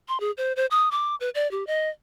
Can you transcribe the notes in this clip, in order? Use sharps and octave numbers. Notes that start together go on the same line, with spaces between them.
C6
G#4
C5
C5
D#6
D6
B4
D5
G4
D#5